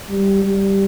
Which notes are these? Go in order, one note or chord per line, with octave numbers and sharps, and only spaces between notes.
G3
G3